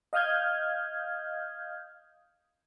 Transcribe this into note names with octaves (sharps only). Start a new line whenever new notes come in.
D#5 F5 D#6 F6 G6 G#6